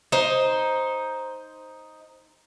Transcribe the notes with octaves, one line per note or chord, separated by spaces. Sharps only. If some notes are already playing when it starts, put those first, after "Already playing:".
D#4 C5